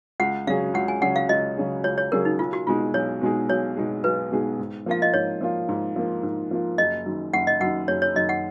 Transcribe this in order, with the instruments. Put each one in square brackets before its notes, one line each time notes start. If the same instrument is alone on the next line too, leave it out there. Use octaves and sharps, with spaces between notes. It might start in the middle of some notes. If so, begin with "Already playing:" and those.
[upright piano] C#2 [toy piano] F#5
[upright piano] C#3 F#3 C#4 G#4 [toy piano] F5
[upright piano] C#2 [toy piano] F#5
[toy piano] G#5
[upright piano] C#3 F#3 C#4 G#4 [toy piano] F#5
[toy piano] F5
[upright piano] C#2 [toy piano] D#5
[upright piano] C#3 F#3 C#4 G#4
[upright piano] C#2 [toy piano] C#5
[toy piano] C#5
[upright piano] C#3 F#3 C#4 G#4 [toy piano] A#4
[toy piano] D#4
[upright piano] B1 [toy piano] F4
[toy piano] F#4
[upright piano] B2 G#3 D#4 G#4 [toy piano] F4
[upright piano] B1 [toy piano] C#5
[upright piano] B2 G#3 D#4 G#4
[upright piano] B1 [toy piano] C#5
[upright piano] B2 G#3 D#4 G#4
[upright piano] B1 [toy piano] B4
[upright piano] B2 G#3 D#4 G#4
G#2
[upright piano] F3 A#3 F4 [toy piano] F5
[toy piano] D#5
[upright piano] G#2 [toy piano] C#5
[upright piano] F3 A#3 F4
G#2
F3 A#3 F4
G#2
F3 A#3 F4
[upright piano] F#1 [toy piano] D#5
[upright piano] F#2 D#3
[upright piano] F#1 [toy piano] F#5
[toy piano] D#5
[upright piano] F#2 D#3 [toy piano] F#5
[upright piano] F#1 [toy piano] C#5
[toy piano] C#5
[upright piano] F#2 D#3 [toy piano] D#5
[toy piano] F#5